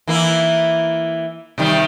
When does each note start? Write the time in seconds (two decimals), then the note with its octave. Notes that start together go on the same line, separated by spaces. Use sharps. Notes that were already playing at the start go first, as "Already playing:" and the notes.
0.08 E3 A#3 E4
1.58 C3 D#3 G3